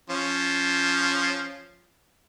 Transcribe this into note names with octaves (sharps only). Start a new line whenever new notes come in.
F3 C#4